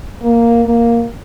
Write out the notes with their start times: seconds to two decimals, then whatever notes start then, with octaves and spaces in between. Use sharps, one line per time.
0.21 A#3
0.65 A#3